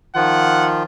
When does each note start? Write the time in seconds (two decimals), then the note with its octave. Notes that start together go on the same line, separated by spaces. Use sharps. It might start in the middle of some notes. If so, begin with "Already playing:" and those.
0.15 D#3 F3 F4 F#5